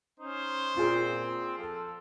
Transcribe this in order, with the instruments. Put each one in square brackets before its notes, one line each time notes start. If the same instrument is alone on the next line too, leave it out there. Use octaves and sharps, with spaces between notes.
[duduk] C#4 [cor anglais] D#4 [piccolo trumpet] C5
[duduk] A#2 [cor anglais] C4 [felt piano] F4 G#4
[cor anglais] F3 [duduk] A4